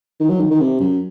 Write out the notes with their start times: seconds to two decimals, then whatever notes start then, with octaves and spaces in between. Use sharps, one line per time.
0.20 D#3
0.30 F#3
0.40 D#3
0.51 D#3
0.61 C3
0.80 F#2